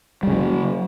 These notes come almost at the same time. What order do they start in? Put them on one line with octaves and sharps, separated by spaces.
G3 C#3 F#3